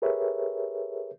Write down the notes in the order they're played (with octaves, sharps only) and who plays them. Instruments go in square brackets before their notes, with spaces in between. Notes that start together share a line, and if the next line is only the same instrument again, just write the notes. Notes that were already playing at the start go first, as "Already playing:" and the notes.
[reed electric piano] G4 G#4 A#4 B4 C#5 E5